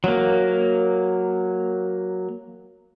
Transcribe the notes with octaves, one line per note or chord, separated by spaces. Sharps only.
F#3 A#3